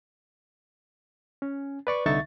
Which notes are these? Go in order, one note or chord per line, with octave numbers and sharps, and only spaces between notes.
C#4
B4 D5 C#6
C2 D3 D#4 E5 C#6 A6